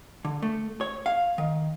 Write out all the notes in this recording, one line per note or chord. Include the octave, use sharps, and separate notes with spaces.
D3
A3
C#5
F5
D#3